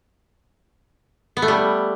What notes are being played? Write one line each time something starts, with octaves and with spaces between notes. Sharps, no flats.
B3
A3
G3